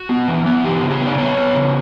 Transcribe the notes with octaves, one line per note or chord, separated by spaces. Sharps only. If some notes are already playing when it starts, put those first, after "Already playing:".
Already playing: F#4
B3
E3
B3
E3 G4
C#3
G#4
B3
D5
B3 C#5
B3
C#3